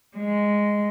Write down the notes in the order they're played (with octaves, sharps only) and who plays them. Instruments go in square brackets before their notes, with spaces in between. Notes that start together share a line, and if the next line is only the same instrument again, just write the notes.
[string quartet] G#3